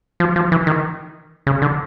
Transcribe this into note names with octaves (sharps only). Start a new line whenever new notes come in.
F3
F3
E3
D#3
C#3
D3